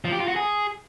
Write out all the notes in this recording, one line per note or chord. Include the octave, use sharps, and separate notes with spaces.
F3
G4
F4
F#4
G#4